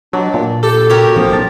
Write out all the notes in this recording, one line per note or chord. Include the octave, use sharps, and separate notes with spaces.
B2 F#3 D4
A#2
G4 A4
C#4 F#4 G4 A#4
A1 F3 B3
B1 A5